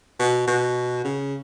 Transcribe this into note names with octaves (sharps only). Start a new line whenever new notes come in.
B2
B2
C#3